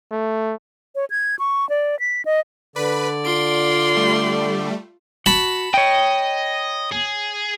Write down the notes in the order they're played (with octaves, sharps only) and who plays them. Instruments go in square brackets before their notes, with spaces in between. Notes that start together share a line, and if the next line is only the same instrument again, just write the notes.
[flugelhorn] A3
[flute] C#5
G#6
C#6
D5
B6
D#5
[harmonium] D3 [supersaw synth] B4 B5 [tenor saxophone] D5
[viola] F4 C6 [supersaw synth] D7
[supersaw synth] G3 A3
[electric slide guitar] F#4 [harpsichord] A5 B5
[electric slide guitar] C#5 G5 [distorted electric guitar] D#5
[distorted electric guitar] G#4